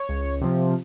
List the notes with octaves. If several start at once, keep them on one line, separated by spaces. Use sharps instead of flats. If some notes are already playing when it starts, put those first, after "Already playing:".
Already playing: C#5
C#2
C3 F3